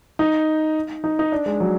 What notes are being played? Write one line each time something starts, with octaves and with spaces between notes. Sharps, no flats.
D#4
D#4
D#4
D4
G#3
F#3